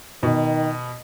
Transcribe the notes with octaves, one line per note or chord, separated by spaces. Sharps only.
B2 D#3